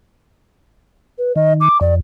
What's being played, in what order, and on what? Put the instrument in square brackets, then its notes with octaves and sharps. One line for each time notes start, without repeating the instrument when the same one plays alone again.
[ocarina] B4
[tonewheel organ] D#3 [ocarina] D#5
[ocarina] D6
[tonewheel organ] F2 [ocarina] D5